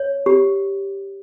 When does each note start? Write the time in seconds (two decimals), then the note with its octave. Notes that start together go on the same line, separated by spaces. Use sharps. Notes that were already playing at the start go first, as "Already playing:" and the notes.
Already playing: C#5
0.26 G4